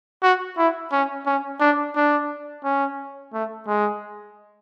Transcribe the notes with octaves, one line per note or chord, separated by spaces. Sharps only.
F#4
E4
C#4
C#4
D4
D4
C#4
A3
G#3